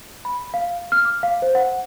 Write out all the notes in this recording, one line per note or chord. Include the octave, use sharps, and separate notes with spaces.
B5
F5
F6
D6
F5
C5
F#5